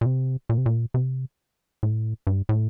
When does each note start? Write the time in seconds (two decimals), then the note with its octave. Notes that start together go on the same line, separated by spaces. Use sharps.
0.01 A#2
0.06 C3
0.49 A#2
0.58 C3
0.66 A#2
0.94 C3
1.83 A2
2.27 G2
2.49 A2